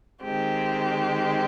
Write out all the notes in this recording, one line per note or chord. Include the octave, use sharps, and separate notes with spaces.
D#3 G#3 C4 G4